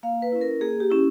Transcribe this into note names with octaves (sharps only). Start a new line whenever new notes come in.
A#3 F5
B4
C#4 E4
A#4
A#3 G#4
G4
C#4 E4